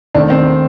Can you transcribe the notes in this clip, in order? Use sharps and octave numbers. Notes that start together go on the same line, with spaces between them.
D#2 D#3 A3 C4 D4
C4